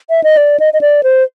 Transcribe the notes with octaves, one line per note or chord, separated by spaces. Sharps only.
E5
D#5
D5
D#5
D#5
D5
C5